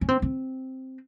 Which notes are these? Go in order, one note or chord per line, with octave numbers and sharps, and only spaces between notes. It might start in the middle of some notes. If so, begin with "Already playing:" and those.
C#4
C4
C4